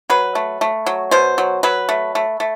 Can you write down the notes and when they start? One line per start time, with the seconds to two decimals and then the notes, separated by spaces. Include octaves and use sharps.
0.10 F#3 B4
0.35 A3
0.61 A3
0.86 F#3
1.11 B2 C5
1.38 F#3
1.63 F#3 B4
1.89 A3
2.15 A3
2.40 A3